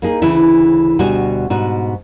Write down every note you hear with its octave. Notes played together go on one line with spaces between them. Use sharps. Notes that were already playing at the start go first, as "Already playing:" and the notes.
A#3 D#4 G#4
D2 C#3 E3 E4
D2 B2 G3 F#4 G#5
G#2 B2 F#4